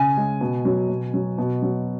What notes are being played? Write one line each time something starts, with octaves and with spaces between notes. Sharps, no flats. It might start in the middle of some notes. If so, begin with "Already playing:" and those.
Already playing: C#3 G#5
G#3
B2
F#3
B2
F#3
B2
F#3